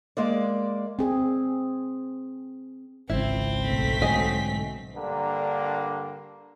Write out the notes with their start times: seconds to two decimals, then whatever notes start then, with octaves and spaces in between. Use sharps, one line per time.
0.17 G#3 A#3 D5
0.99 C4 G#4
3.10 G#1 C#2 C4 E4
3.63 B1 A3 B6
4.02 G#2 D3 F#3 D#5 G#5
4.95 G2 D3 A#3 D4